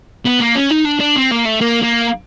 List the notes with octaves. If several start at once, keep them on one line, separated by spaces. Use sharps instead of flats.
B3
A#3
C#4
D#4
D4
D4
C4
A#3
A3
A#3
A#3